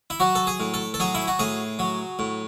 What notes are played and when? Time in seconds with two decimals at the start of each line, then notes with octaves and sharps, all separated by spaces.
0.10 E4
0.20 F#3 F#4
0.35 A4
0.47 G#4
0.60 A2
0.74 A4
0.94 A4
1.00 F#3 G#4
1.15 E4
1.28 F#4
1.39 A2 G#4
1.79 F#3
2.19 A2